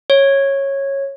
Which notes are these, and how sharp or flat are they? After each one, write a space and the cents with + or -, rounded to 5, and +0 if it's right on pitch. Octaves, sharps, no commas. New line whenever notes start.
C#5 -10